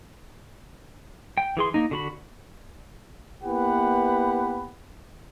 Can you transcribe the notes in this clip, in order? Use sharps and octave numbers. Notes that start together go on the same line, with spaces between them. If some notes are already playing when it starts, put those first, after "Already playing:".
G5
E3 G#4 C6
A#3 D#4
D3 F#4 B5
A#3 B3 E4 G4 B4 F#5